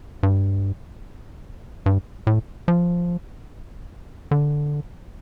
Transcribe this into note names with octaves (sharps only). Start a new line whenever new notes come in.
G2
G2
A2
F3
D3